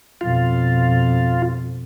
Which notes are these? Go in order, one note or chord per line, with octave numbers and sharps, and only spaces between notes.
F2 B2 F4